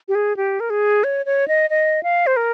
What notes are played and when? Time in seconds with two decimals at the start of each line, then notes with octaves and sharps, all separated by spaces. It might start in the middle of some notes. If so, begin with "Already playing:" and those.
0.08 G4
0.15 G#4
0.37 G4
0.60 A#4
0.70 G#4
1.04 C#5
1.26 C#5
1.48 D#5
1.70 D#5
2.03 F5
2.27 C5
2.37 A#4